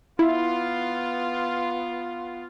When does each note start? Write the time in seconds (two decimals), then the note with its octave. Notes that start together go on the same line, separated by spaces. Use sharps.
0.19 B3 E4 F4